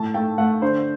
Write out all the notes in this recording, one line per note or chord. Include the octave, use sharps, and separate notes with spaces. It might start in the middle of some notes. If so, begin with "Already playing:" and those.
Already playing: A2 A5
A3 G5
A3 F#5
D3 C5